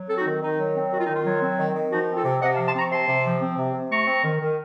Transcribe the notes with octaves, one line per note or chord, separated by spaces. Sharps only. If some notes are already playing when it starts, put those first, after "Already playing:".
Already playing: F#3
C4 A4
D#4 F#4
D#3
D#3 D#4
F#3
C4
D#3 F#4
F4
D#3 D#4
F4
F#3
C4
D#3
D#3
F3 D#4 F#4
C4
F4 A4
C3
C3 D#5 F#5
F5 A5
F3
A5 C6
C4 A#5 C#6
C3 A5 C6
C3
F3
C4
C3
C3
A3 A#5 C#6
C4
D#3
D#3